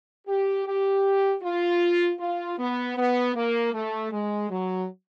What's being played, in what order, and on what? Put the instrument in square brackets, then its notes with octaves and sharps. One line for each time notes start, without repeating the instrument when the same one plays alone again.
[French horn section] G4
G4
F4
F4
B3
B3
A#3
A3
G#3
F#3